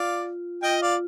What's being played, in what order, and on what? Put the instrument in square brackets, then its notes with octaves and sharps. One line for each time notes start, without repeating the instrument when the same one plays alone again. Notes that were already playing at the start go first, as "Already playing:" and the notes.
Already playing: [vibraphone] F4 [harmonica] D5 F5
[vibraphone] F4 [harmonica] D#5 G5
[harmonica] D5 F5